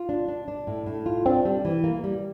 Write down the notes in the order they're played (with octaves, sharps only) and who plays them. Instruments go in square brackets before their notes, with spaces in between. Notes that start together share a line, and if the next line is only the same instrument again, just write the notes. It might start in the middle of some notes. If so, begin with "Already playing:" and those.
Already playing: [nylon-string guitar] F4
D4
D4
D4
A2
A2
F4
[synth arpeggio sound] C4 [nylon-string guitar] D4
[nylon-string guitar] G3
E3
A#3
G3